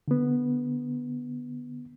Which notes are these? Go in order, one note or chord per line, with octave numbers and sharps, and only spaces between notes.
D3 B3